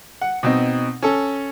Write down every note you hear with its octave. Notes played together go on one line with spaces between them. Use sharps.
F#5
B2 C4 D#4
C#4 A4